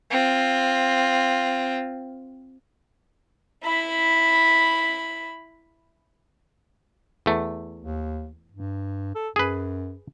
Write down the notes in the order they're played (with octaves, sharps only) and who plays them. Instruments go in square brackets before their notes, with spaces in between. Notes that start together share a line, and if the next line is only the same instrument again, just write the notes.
[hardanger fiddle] C4 F4
E4 B5
[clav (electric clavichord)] E2 A3
[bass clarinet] D#2
G2
A4
[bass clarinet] F#2 [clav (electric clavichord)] G#4 B4